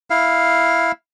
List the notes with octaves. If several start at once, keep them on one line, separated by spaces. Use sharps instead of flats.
E4 F5